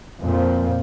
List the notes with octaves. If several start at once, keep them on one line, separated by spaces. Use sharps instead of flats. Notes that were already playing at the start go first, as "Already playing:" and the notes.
F2 A#2 F3